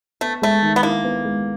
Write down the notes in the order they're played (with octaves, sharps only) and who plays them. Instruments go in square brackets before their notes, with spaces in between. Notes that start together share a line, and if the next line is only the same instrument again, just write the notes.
[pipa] A3 [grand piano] B3
[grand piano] G#3 [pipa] A3
[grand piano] D#3
[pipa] B3
[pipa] A#3 [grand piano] E4
[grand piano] B3
G#3